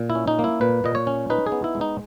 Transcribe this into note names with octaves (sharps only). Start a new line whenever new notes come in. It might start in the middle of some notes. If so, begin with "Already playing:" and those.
Already playing: A#2
E4
C#4
D#4
A#3
E4
A#2 B4
A#2 D#5
C#5
C#4
D#4 B4
G#4
B3
E4
G#3
D#4